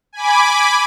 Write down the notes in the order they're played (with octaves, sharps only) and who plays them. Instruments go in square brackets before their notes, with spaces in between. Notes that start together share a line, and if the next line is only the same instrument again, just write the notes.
[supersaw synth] G#5 B5 D6